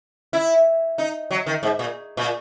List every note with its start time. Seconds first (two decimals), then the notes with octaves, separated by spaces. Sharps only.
0.33 E4
0.98 D#4
1.31 F#3
1.46 D#3
1.63 G#2
1.79 A#2
2.17 A#2